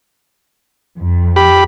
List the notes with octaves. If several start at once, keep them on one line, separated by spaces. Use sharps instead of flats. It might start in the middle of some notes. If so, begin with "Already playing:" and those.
F2
G4 B5